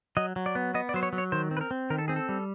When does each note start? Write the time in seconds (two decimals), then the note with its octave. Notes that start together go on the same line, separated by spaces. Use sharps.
0.17 F#3 D#5
0.36 F#3
0.46 D5
0.55 B3
0.74 B3 D#5
0.89 D5
0.94 F#3 C5
1.03 C#5
1.13 F#3
1.18 C#5
1.32 D#3 C5
1.51 C4
1.57 B4
1.61 A#4
1.71 C4
1.90 D#3 A#4
1.98 A4
2.08 C4 G#4
2.16 A4
2.29 G3